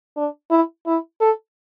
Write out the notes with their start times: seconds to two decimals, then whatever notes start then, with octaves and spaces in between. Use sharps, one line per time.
0.16 D4
0.50 E4
0.86 E4
1.21 A4